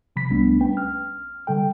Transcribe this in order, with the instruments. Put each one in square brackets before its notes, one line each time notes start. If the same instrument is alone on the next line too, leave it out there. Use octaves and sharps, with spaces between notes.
[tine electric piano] C3 F3 B5 B6
C2 G3 A3 B3 D4
C#4 B4 G5
F6
D3 G3 A4 G5